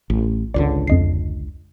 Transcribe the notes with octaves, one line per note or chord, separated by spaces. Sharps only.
A1
G#1 C#2 D3 D5
F2 D#5 C7